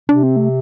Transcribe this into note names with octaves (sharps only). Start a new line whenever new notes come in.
C3 D4
C4
A3